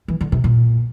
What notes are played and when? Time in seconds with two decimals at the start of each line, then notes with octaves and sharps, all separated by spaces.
0.08 E3
0.21 D3
0.32 C3
0.44 A#2